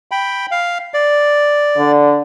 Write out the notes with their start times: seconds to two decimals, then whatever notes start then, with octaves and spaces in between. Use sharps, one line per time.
0.11 G5 B5
0.51 F5
0.94 D5
1.77 D3